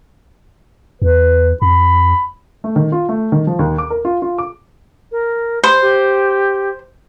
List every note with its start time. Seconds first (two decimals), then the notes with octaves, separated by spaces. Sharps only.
1.02 E2 B4
1.62 F2 B5
2.64 A3
2.76 D#3
2.92 F4
3.09 A3
3.32 D#3
3.47 F3
3.59 D#2
3.78 D6
3.90 A#4
4.05 F4
4.22 F4
4.38 D6
5.12 A#4
5.64 C5 B5
5.81 G4